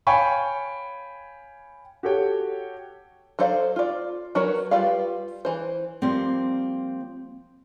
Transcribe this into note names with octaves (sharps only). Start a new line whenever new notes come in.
C#5 F5 G5 G#5 B5 C#6
F#4 G4 A4 C#5 G5
F#3 A4 C5 D5 F5
F4 D5
F#3 F#4 A#4 B4 C#5
G3 F4 B4 D5 F5
E3 C5
F3 G3 A#3 C4